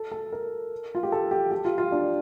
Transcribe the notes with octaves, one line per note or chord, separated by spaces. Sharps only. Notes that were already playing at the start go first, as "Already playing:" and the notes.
Already playing: A4
A4
A#4
F4
G4
A4
G4
G4
F4
F4
D4